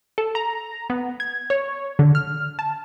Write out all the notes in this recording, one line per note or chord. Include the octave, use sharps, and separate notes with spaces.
A4
A#5
B3
G#6
C#5
D3
F6
A5